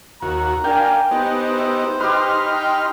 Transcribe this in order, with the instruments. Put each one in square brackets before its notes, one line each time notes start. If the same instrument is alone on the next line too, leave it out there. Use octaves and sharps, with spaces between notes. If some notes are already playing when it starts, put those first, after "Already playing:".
[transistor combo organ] D#2 F#4 [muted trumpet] A#5
[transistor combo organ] D4 A#4 F5 [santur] G5 G#5
[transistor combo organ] B3 D#4 G4 [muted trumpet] C5
[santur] E5
[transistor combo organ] D#4 C6 F6 [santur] G4 B4
[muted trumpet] G5